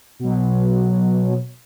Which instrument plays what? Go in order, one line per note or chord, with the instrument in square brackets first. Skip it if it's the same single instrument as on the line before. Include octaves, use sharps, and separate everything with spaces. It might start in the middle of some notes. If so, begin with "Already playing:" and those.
[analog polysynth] B2 F#3